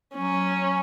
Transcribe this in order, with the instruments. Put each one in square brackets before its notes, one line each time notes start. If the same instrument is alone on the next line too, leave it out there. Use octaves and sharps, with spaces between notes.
[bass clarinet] F#3 [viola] C#4